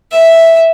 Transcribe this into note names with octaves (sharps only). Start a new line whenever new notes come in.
E5